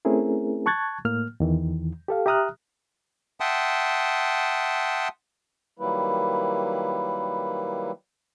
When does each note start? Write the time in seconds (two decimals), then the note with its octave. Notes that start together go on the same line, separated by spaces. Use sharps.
0.05 A3 C4 C#4 E4 G#4 A#4
0.66 A5 C#6 F#6 G#6 A6
1.05 A2 A#3 F6
1.40 E2 D#3 E3
2.08 G4 A4 F5
2.26 G4 E5 A#5 D#6 F6 F#6
3.40 E5 F#5 G5 A5 C6 D#6
5.79 D#3 F#3 G3 A#3 E4 B4